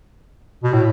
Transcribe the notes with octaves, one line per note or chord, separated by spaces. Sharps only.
B2
A2